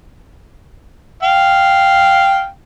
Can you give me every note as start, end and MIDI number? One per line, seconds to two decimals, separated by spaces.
1.23 2.46 77
1.23 2.46 79